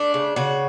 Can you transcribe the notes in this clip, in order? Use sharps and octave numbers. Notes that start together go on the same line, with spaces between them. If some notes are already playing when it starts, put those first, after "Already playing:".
Already playing: A3 D4
C#3
C#3 F#4